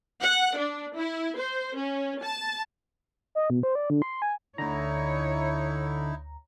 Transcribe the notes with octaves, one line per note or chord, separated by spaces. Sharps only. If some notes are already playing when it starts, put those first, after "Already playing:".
F#5
D4
E4
C5
C#4
A5
D#5
B2
C5
D5
D3
C6
G#5
D2 D3 D#4 E4 C#5 A#5